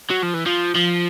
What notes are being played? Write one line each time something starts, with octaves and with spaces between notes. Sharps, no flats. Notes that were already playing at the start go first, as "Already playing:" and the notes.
F#3
F3
E3
F3
F3